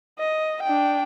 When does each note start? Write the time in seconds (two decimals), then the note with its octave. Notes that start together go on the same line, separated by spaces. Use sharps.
0.19 D#5
0.63 D4 G5